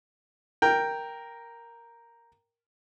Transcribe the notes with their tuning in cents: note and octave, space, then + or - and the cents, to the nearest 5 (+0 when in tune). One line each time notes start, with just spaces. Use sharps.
A#4 +0 G5 +0